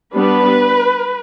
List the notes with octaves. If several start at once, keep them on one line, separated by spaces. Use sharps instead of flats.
G3 B3 D4 B4